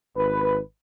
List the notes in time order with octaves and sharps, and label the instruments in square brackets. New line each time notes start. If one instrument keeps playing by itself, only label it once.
[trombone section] G#1 B4